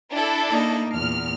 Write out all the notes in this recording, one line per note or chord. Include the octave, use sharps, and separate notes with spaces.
D4 E4 A4
A#3 D#4
E2 A#2 F6